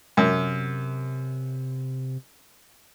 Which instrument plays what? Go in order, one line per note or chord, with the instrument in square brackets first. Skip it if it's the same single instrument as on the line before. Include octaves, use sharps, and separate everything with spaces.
[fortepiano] F#2 [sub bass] C3